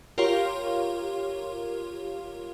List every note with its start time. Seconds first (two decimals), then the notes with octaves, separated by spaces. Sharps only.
0.18 F4 G4 A#4 C#5 F5 C6